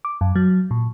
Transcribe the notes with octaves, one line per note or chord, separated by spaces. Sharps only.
D6
F#2
F#3
A#2